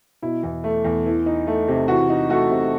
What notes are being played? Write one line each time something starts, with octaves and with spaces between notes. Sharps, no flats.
B2 E4
E2
A3
E2
E3
D#4
A3
C3
E3 F#4
D#4
A3 F#4 A4
C3